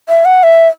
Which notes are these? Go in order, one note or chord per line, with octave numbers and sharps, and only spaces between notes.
E5
F#5
E5